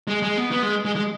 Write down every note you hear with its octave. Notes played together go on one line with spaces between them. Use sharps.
G#3
G#3
B3
B3
G#3
G#3
G#3